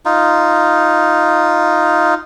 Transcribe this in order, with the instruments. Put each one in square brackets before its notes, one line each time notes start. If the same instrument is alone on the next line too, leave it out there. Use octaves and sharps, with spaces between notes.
[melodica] D#4 F4